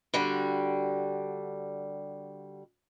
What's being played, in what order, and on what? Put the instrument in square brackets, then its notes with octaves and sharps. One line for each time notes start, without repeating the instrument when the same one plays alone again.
[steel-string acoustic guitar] D3 G3 F#4